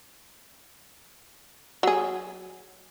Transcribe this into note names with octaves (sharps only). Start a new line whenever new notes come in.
F#3 G#4